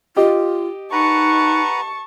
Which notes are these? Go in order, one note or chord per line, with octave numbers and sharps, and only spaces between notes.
F4 G4 D#5
D#4 B4 F#5 A5 A#5 C#6